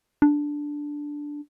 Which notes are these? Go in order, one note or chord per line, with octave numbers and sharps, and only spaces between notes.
D4